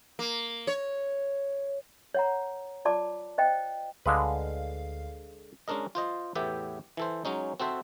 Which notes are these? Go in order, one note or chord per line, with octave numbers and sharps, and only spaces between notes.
A#3
C#5
C#5 F#5 A#5
F4 D5 A5 D6
C5 D#5 G5
D2 D3 G#3 B4 F5
G#3 C#4 D4 A#4 D#5
F4 C5 D#5
E2 A2 B3 G4 E5 G5
E3 A4 C5
F#3 G#3 C#4 D#4
C4 F#4 A4 C5 E5